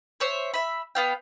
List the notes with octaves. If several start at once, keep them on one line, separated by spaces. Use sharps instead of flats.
C5 C#5 E5
E5 B5
B3 F5 G5